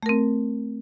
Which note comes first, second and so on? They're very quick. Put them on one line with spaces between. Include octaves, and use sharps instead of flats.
A3 A#4 C4